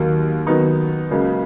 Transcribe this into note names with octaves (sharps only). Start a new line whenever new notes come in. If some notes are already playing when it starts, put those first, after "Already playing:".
Already playing: D#2 D#3 F#3 A#3
D#3 F#3 B3 D#4
C#2 C#3 F#3 A#3